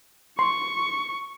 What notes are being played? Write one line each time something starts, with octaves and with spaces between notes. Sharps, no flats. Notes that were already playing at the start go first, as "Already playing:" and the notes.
C6 C#6